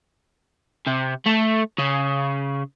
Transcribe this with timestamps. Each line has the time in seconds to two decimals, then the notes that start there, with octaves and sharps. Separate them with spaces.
0.87 C3
1.26 A3
1.78 C#3